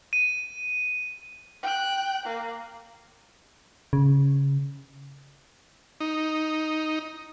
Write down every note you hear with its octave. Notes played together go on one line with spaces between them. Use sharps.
D#7
G5 F#6
A#3
C#3
D#4